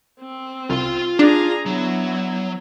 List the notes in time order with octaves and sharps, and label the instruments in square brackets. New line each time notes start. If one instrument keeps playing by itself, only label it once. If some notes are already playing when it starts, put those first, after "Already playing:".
[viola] C4
[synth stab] C2 [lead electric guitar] F4 C6
[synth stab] D4 [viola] G#4 A#5
[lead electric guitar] F#3 [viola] B3 E4